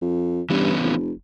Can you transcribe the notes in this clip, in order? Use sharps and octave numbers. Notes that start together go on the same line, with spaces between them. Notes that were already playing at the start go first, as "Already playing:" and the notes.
F2
G2 E3 B3 C#4
F1